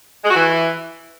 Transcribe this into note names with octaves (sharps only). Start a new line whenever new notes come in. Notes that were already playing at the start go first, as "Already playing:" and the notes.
G#3
F#4
E3